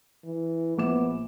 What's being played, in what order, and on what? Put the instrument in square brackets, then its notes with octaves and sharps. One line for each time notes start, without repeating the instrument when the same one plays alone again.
[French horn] E3
[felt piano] A#1 D6 E7 [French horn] B3